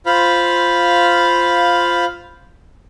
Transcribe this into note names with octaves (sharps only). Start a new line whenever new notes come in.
F4 C5 F5 B5